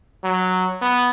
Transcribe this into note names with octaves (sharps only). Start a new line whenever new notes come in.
F#3
B3